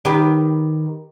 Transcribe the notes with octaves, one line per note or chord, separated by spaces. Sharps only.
D#3 G4 B4